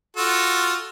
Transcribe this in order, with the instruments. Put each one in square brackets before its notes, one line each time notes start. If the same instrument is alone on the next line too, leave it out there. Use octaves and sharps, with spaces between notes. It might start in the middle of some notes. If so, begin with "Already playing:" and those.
[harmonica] F4 F#4 A4